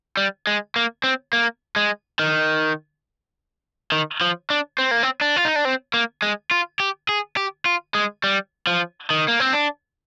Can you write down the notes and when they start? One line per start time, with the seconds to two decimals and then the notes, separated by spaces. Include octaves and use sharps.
0.17 G3
0.47 G#3
0.76 A#3
1.04 C4
1.33 A#3
1.76 G#3
2.19 D#3
3.92 D#3
4.21 F3
4.50 D4
4.79 C4
4.91 A#3
5.03 C4
5.21 D4
5.36 F4
5.45 D#4
5.56 D4
5.65 C4
5.94 A#3
6.22 G#3
6.51 F4
6.80 G4
7.09 G#4
7.37 G4
7.66 F4
7.95 G#3
8.24 G3
8.67 F3
9.10 D#3
9.28 A#3
9.40 C4
9.53 D4